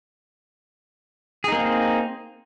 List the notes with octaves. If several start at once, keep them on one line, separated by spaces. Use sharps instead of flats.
A#3 C4 D#4 G#4